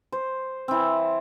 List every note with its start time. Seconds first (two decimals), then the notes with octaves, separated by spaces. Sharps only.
0.12 C5
0.68 E3 C4